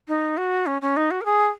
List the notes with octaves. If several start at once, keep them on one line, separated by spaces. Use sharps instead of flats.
D#4
F#4
C#4
C#4
D#4
F#4
A#4
G#4